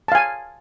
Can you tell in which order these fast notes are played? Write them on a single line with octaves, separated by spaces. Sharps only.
A5 F5 G#5